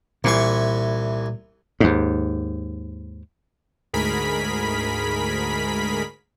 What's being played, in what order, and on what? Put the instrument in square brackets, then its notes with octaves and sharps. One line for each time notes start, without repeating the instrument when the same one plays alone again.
[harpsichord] C2 E3 C#6 [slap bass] A#2
[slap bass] D#2 G#2
[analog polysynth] D2 G#2 G#4 A#4 B5 B6